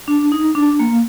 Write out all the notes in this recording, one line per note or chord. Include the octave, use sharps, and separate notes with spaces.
D4
D#4
D4
A#3